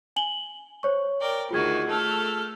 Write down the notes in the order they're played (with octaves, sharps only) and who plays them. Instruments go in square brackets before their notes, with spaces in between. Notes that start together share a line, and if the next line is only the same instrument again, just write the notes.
[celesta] G#5 F#7 G7
C5 C#5 C#6
[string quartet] A#4 D5 G5
[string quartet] D2 D#3 F#4 [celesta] F4 G#4 G#6
[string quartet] A3 A4 F6